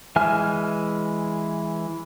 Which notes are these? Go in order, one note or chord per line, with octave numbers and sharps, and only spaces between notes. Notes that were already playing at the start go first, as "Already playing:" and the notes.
E3 G#3 E5 G#5 F6